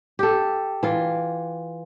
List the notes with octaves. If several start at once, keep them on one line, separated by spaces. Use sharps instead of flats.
G4 A4
E3 F4